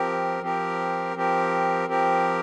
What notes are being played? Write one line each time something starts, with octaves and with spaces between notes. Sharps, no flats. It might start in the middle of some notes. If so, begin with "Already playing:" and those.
Already playing: F3 C4 G4 A#4
F3 C4 G4 A#4
F3 C4 G4 A#4
F3 C4 G4 A#4